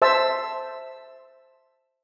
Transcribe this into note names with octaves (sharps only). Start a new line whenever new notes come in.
C5 E5 A5 E6